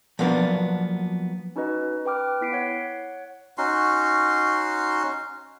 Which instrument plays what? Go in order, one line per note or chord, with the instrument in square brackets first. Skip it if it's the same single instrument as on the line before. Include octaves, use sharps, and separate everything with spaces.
[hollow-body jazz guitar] F3 F#3 A#3 B3 D4
[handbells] C#4 D#4 F#4 B4 D#5
B4 G5 D6 F6
B3 E4 B6 C7 D7
C#5 F#5
[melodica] C#4 D#4 F#4 C6